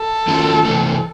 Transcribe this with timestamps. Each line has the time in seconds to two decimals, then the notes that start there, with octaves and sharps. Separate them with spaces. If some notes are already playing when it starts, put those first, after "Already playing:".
Already playing: A4
0.27 D#3 F#3 A3 C#4 F4
0.65 C3 E3 A3